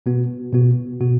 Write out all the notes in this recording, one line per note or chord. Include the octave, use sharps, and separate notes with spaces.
B2 B3 F#4
B2 B3 F#4
B2 B3 F#4